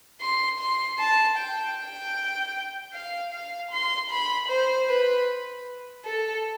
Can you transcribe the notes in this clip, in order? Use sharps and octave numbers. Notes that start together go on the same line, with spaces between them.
C6
C6
A5
G5
G5
F5
F5
C6
B5
C5
B4
A4